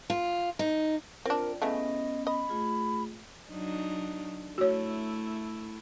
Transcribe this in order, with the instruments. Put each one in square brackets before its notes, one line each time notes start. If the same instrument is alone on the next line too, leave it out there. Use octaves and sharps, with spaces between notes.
[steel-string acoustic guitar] F4
D#4
[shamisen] C4 D4 [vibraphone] F4 D5 [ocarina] A#4
[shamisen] C#3 E3 A3 [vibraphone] B3 C#4 [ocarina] D#5
[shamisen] D#5 [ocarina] B5
[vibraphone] A3 F4 G#4
[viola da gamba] F#3 D4 D#4
[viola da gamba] A3 E4 [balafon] F#4 C#5